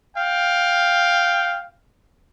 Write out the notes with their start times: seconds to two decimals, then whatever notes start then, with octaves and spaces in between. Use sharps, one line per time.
0.15 F5 G5